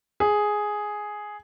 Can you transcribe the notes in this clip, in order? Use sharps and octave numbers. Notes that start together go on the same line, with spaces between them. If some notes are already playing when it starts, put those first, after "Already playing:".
G#4